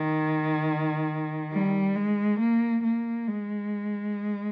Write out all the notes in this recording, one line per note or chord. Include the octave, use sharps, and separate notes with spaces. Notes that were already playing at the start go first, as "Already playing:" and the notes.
Already playing: D#3
G3
G#3
A#3
A#3
G#3